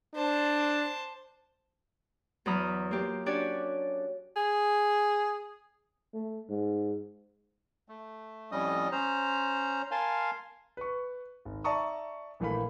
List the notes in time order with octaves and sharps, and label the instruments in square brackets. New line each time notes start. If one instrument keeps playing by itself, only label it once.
[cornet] D4 [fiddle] C5 A5
[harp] E2 F#3 A#5 B5 D#6 F6
A#3 F4 G4
C#4 D4 F#4 G4 C#5 D5
[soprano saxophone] G#4
[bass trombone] A3
G#2
[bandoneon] A3
F2 A2 G3 C#4 D#5 D#6
C#4 C5 A#5
A#4 F5 G#5 A5 C6
[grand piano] B4 C#6
G#1
D5 E5 A5 A#5 C#6 D#6
A#1 E3 A3 A#3 F5 B5